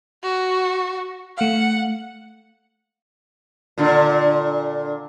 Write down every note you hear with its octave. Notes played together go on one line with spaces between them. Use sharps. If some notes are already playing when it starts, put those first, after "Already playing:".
F#4
A3 F5 F#5
A#2 D3